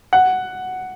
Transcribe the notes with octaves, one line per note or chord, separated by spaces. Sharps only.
F#5